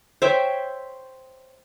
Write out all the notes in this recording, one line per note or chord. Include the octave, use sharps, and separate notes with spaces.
C5 C#5 E5 G5